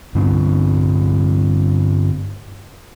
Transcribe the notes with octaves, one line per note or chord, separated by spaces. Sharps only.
G2 D3 C4 D4